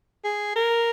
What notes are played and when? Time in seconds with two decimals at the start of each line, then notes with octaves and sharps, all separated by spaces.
0.24 G#4
0.56 A#4